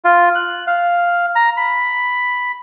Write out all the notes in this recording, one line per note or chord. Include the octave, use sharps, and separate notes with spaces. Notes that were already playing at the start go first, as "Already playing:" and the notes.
F4
F#6
F5
A#5
B5